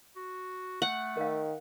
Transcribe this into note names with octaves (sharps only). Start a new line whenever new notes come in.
F#4
A3 F#5
D#3 A#4 F5